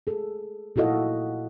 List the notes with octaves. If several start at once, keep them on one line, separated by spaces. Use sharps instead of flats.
G#4 A4
A#2 E4 F#4 A4 D#5 F5